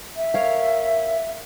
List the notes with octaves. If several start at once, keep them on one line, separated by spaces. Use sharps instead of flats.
E5
A#4 C#5 F5